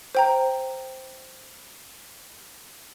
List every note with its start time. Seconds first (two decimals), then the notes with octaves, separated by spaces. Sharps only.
0.15 C5 G5 A#5